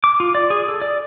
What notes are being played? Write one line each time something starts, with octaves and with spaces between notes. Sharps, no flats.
D6
F4
D5
G#4
A4
D5